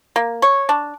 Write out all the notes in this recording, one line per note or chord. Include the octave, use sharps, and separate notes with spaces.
A#3
C#5
D4